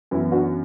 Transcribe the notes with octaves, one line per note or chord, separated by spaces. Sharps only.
F#2 E3 B3 E4
D4 F#4